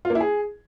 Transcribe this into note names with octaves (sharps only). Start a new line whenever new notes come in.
F4
A#3
E4
G#4